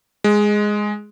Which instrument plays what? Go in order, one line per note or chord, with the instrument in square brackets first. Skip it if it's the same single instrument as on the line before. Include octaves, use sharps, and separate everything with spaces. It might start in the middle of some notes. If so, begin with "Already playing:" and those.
[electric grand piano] G#3